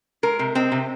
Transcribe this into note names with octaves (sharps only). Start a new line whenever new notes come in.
G#3 A#4
C3
G#3 C4
C3